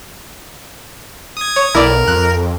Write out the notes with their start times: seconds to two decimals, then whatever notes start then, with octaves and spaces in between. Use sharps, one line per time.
1.37 D#6 G#6
1.56 C#5
1.75 B1 E4 A#4 D5
2.08 F2 F#6